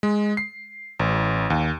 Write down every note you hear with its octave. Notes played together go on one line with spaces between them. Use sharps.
G#3
C7
A1
D#2